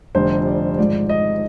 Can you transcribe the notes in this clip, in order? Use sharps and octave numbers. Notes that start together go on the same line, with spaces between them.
F1 F2 D3 G3 C5
D5
G#1 G#2 F3 G#3 D5
D#5